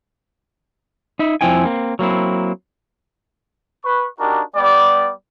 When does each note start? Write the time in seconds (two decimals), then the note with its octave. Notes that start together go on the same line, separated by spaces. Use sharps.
1.19 D#4 E5
1.41 F2 F3 C4 E4 G5 G#5
1.65 A#3 C4
1.99 F#3 A#3 C4 E4
3.84 B4 C#6
4.20 D4 D#4 F#4 G4 A#4
4.56 G3 B3 D5